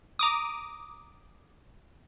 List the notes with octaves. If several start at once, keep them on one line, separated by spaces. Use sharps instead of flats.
A#5 D6 D#6